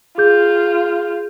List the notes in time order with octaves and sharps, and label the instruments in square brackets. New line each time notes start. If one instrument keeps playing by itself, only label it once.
[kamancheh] F4 [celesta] G#4 G6